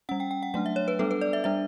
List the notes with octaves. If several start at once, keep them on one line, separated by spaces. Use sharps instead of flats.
G3 C#4 F#5
G5
G5
F#5
F#3 A3 D4 F#5
E5
C#5
B4
G3 B3 D4 A4
B4
D5
E5
G3 D4 E5